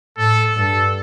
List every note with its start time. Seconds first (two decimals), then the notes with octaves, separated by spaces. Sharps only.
0.18 A2 A4
0.55 G2 A4